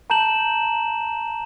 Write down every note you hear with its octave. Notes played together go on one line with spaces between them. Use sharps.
A5 A#5 G6 E7 F#7